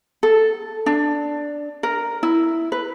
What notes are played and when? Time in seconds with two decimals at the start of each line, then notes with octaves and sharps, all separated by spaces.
0.23 A4
0.86 D4
1.83 A#4
2.23 E4
2.72 B4